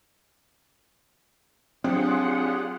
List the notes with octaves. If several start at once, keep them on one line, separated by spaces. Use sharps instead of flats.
F#3 C4 D4 F4 G4 G#4 F#5